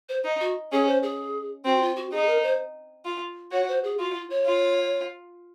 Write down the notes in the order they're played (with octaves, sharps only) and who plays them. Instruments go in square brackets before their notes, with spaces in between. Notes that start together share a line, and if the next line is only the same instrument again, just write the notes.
[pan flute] C5
[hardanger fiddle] D#4
[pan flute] F#4
[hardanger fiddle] C#4 [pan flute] G#4
[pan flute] C5
G#4
[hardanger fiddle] C4 [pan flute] F#4
[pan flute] F4
F#4
[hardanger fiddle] D#4 [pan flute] G#4
[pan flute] A#4
C5
[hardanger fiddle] F4
[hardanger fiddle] F#4 [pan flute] C#5
[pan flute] C5
G#4
[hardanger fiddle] F4 [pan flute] F#4
[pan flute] F4
C#5
[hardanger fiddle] F4